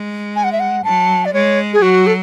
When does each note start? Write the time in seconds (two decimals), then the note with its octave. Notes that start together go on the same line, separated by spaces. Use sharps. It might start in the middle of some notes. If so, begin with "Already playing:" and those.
Already playing: G#3
0.36 G#5
0.44 F#5
0.52 E5
0.60 F#5
0.84 F#3 A5
1.25 D5
1.34 G#3 C#5
1.73 G#4
1.82 F#3 F#4
2.07 A4